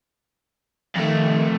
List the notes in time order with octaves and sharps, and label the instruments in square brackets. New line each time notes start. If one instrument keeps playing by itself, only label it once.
[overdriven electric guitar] F2 A3 [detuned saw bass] D#3